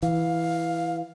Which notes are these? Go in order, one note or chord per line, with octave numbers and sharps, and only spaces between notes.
E3 F5